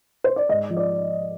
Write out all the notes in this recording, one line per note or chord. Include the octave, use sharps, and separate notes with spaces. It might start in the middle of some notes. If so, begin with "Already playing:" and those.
C5
D5
G#2 D#5
F3
D5